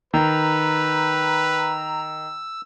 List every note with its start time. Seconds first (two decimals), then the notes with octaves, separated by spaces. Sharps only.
0.14 D#3 B4 A#5 E6